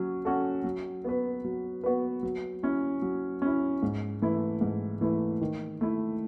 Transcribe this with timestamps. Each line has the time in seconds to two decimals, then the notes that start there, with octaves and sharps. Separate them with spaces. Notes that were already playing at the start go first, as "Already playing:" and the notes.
Already playing: F#3 C#4 F#4
0.25 C#4 F#4 A4
0.64 F#3
1.04 B3 F#4 B4
1.45 F#3
1.84 B3 F#4 B4
2.23 F#3
2.63 C#4 E4
3.02 F#3
3.42 C#4 E4
3.83 G#2
4.22 E3 A3 E4
4.61 G#2
5.01 E3 A3 E4
5.41 D#3
5.81 A3 E4